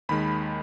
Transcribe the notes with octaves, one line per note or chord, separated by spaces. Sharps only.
D#2 D#3 G#3 B5